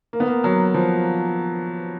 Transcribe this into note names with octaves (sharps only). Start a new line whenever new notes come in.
A#3
B3
A#3
F#3
F3